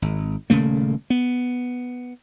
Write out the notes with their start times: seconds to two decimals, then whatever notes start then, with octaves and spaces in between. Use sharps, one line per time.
0.02 G#1
0.50 D#1 C#3 A3 A#3
1.10 B3